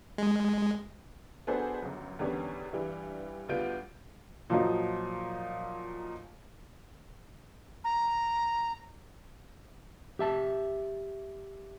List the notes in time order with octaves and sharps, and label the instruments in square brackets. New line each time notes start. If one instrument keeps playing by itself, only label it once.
[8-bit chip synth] G#3
[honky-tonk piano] B3 D4 F#4 G#4 A4 C5
G1 F#2
E2 D3 D#3 G3 B3 C#4
G2 E3 G3 E4
D2 G3 B3 F4 G6 D7
[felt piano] A#2 F3 F#3 D#4
[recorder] A#5
[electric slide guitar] G4 E5 A5